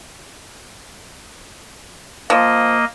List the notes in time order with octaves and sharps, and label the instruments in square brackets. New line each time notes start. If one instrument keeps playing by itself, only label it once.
[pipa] F3 [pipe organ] A#3 D#5